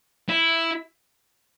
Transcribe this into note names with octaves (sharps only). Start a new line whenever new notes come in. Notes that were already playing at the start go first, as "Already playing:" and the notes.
E4